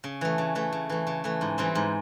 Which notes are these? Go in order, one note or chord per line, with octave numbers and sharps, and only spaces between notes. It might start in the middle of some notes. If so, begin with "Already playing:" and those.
C#3
E3 A3
C#3
E3 A3
C#3
E3 A3
C#3
E3 A3
G#2
E3 G3 C4
G#2